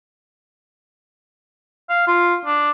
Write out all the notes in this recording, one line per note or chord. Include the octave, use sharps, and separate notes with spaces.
F5
F4
D4